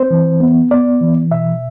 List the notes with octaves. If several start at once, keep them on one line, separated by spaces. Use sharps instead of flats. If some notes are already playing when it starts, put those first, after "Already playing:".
Already playing: C4 C5
E3
B3
B3 D5
E3
B2 E5